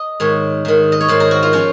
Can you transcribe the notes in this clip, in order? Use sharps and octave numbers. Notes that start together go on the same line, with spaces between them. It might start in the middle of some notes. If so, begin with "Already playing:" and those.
Already playing: D#5
G#2 D#3 C#5
G#2 D#3
D#5
C#5
G#2 D#3 C5
A#4
F#4
F4
F3 C#4